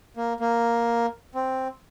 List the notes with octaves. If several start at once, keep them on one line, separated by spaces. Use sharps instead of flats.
A#3
A#3
C4